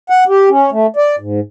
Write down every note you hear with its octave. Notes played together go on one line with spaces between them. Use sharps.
F#5
G4
C#4
A3
D5
G#2